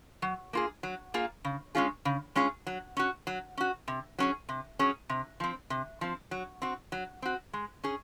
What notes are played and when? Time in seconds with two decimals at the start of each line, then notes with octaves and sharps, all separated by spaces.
0.22 F#3
0.53 A#3 F4 G#4
0.83 F#3
1.14 A#3 F4 G#4
1.45 C#3
1.75 G#3 C#4 F4 G#4
2.05 C#3
2.35 G#3 C#4 F4 G#4
2.67 F#3
2.97 C#4 F#4
3.27 F#3
3.58 C#4 F#4
3.88 C3
4.19 F#3 C#4 G#4
4.49 C3
4.79 F#3 C#4 G#4
5.09 C3
5.40 F3 C4
5.70 C3
6.01 F3 C4
6.31 F#3
6.62 C4 F#4
6.92 F#3
7.22 C4 F#4
7.53 G#3
7.84 C#4 G#4